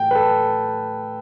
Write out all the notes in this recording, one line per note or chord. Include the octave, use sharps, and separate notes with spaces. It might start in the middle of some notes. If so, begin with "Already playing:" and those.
Already playing: A2 E3 A3 G5
B4
A4